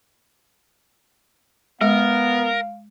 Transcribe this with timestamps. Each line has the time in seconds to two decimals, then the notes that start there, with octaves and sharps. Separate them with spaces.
1.81 G#3 B3 A#4 F5